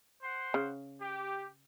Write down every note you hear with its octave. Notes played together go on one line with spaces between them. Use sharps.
C5 F#5 C6
C#3
G4